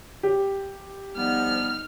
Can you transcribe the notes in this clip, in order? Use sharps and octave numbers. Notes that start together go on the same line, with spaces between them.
G4
F3 G3 B3 D#4 F6